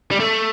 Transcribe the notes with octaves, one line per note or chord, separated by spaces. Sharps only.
G3
A3